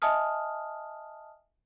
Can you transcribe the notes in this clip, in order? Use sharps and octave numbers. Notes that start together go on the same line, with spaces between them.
D#5 E5 G#5 A5 D#6 F6